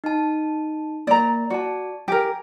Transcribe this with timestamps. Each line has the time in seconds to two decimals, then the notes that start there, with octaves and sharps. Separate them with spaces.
0.04 D#4 A5
1.07 A#3 D5 A#5
1.50 F#4 D5 A5
2.08 G4 A#4 G#5